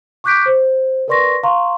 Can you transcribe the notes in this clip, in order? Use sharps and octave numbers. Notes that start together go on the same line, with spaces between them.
C#6 D6 F#6 G6 B6 D7
C5
A#4 B4 D5 C6 C#6 A#6
F5 A#5 C6 C#6